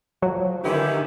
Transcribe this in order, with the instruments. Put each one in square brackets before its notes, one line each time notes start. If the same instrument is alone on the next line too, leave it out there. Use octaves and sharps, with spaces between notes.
[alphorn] F3 [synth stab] F#3
[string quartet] D3 D#3 [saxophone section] C#4 E4 G4 [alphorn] B4